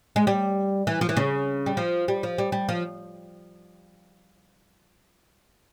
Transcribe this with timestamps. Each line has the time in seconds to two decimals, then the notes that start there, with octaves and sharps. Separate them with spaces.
0.16 G#3
0.27 G3
0.87 E3
1.01 F3
1.09 E3
1.17 C#3
1.66 G3
1.77 F3
2.08 G3
2.23 F3
2.38 G3
2.52 G3
2.69 F3